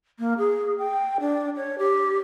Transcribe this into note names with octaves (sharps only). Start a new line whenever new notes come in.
A#3
G#4
G5
D4
C#5
G4